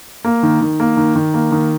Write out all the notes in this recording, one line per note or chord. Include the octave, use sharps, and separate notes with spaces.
A#3
D#3
D#3
A#3
D#3
D#3
A#3
D#3